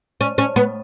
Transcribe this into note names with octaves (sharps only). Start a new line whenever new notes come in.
C#4
C#4
B3